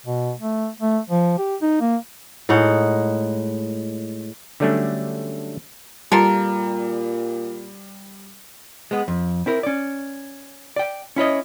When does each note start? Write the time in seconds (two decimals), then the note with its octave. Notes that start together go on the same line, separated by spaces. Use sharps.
0.06 B2
0.39 A3
0.80 A3
1.10 F3
1.38 G4
1.62 D#4
1.81 A#3
2.49 A2 G#3 D#4 F#5
4.60 D3 F#3 G3 A3 C#4 D4
6.12 A#2 G3 F4 A4 A#4 A#5
8.91 G#3 B3
9.08 F2
9.46 C4 E4 A#4
9.63 C#4 D5
10.76 D5 G5
11.16 C#4 E4 C#5 D#5